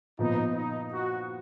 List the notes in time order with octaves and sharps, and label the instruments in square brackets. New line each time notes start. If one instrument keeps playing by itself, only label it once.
[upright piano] A#2 F3 B3 [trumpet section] D#4
[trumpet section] D#4
F#4